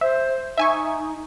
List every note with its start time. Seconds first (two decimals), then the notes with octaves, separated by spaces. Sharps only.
0.01 C5 E5
0.58 D#4 E5 G#5 C#6